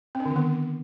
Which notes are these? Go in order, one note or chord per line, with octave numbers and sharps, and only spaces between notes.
C4
D4
D3
D#3
B3